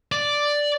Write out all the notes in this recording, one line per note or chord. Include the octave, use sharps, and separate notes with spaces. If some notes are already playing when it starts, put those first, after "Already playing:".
D5